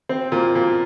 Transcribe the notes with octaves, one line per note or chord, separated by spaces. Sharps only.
C4
A#2
A#2